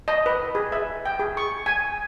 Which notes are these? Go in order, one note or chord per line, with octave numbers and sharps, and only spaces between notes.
D#5
B4
G#4
E5
G5
G#4
C#6
G#5